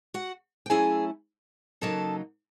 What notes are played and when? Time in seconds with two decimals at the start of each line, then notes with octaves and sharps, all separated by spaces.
0.14 F#4 F#5
0.66 G5
0.70 F#3 A3 C#4 E4 G#4 G#5
1.81 C#3 F#3 A#3 D#4 A4 A5